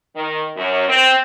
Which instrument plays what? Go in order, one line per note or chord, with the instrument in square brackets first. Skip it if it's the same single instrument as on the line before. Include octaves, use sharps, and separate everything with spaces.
[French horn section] D#3
F#2
C4